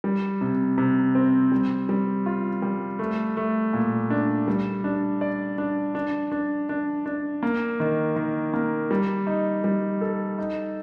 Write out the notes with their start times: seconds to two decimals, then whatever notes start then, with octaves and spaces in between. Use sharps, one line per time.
0.04 G3
0.41 C3
0.78 C3
1.15 C4
1.52 G3
1.89 G3
2.26 F4
2.62 G3
2.99 A3
3.37 A3
3.73 A#2
4.10 D4
4.48 G3
4.84 D4
5.21 D5
5.58 D4
5.95 D4
6.32 D4
6.69 D4
7.06 D4
7.43 A#3
7.80 D#3
8.16 D#3
8.54 A#3
8.91 G3
9.27 D#4
9.64 G3
10.01 A4
10.38 D#4